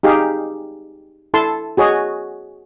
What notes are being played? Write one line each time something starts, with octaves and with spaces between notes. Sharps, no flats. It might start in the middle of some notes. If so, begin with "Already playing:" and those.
D#4 G4 G#4 F5
E4 A4 A5 C6
F#4 G#4 C#5 D#5